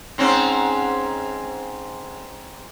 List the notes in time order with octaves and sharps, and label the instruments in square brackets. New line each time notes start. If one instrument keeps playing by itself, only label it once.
[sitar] G#2 C4 C#4